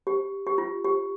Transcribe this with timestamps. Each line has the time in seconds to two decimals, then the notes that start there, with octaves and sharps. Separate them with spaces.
0.07 G4
0.47 G4
0.58 F4
0.84 G4